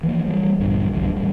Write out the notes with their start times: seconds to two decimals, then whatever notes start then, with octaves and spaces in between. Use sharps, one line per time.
0.03 E3 F3 G#3 A#3
0.26 E3 G3
0.59 A#1 G2 D3
0.93 B1 E2 G2 D3
1.17 A1 G3